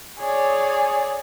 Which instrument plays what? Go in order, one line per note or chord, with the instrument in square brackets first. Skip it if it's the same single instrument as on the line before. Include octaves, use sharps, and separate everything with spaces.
[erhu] G#4 [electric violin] C#5 D5